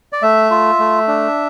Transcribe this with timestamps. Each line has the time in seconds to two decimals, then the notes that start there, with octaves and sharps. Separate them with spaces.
0.13 D5
0.22 A3 E5
0.51 F4
0.79 A3
1.08 D4